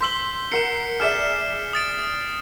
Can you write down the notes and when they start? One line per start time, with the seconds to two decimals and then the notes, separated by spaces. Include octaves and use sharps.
0.01 C6 E6 G6 B6 F#7 G7
0.52 A#4 F#5 C7 C#7 E7
1.00 G#4 D5 E5 F6 E7
1.73 D#6 A6 D7